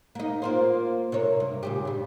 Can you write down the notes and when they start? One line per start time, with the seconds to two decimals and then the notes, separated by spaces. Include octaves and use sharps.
0.15 A#3 D#4
0.42 A#3 F4 C5
1.12 C3 A#3 C#5
1.40 G2
1.63 A#2 C#3 G4
1.85 G2 G3